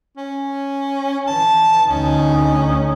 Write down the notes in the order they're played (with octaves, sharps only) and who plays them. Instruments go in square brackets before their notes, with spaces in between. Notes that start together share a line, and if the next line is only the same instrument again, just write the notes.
[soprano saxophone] C#4
[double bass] E3 [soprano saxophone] A5
[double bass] D2 D#4 [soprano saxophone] C#4